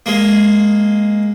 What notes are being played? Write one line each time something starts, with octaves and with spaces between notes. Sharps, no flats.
G#3 A#3